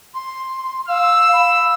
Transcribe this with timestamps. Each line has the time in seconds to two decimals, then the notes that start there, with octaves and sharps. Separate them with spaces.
0.14 C6
0.88 F5 E6
1.32 B5